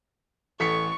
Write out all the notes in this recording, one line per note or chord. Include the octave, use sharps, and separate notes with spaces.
A1 A4 F#5 C#6 B6 C#7